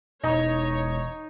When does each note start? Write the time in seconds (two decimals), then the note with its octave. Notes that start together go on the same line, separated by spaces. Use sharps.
0.24 E1 D#4 C#5